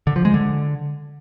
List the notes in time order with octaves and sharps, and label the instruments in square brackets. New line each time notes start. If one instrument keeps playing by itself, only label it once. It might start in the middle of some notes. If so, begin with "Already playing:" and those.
[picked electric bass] D3
F3
G#3
D3